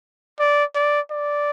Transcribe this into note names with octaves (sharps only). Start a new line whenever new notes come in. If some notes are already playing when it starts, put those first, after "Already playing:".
D5
D5
D5